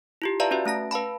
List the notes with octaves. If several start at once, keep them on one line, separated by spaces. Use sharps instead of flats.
E4 F4 G4
B4 D5 E5 F5 A5 A#5
C#4 F#4 B4 E5
A3 C#4 A5 A#6
B4 F5 A5 B5